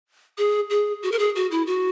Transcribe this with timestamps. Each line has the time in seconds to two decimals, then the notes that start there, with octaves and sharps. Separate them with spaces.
0.38 G#4
0.70 G#4
1.03 F#4
1.12 A#4
1.19 G#4
1.35 F#4
1.51 E4
1.67 F#4